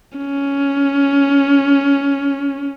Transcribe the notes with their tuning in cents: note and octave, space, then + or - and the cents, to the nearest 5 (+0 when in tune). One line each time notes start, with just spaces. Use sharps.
C#4 +10